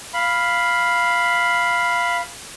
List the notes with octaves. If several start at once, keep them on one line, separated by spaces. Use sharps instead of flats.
F5 B5